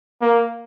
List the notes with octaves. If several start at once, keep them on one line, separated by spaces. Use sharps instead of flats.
A#3